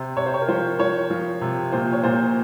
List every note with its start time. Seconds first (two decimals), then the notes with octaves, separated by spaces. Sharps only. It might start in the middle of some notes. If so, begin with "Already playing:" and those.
Already playing: C3 C5
0.17 C3 C#5
0.26 C5
0.34 C#5
0.41 A#4
0.48 F3 C5
0.79 F3 C#5
1.10 F3
1.41 C3
1.72 A#2 C5
1.93 C#5
2.03 A#2 C5